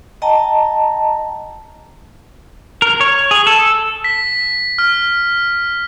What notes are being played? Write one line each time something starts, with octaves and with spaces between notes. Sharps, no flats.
D#5 G5 A5 A#5
A#4
C#5
G#4
A4
B6
F6